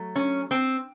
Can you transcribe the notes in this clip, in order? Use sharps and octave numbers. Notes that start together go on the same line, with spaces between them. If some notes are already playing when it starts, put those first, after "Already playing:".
Already playing: F#3 A3
C#4
C4